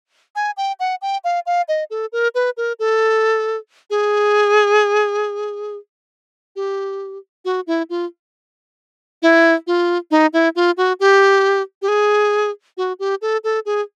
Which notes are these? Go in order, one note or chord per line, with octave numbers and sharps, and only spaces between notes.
G#5
G5
F#5
G5
F5
F5
D#5
A4
A#4
B4
A#4
A4
G#4
G4
F#4
E4
F4
E4
F4
D#4
E4
F4
F#4
G4
G4
G#4
F#4
G4
A4
A4
G#4